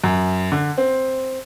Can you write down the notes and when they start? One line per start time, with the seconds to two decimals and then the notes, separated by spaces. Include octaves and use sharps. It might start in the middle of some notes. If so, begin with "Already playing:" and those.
0.04 F#2
0.52 D3
0.78 C4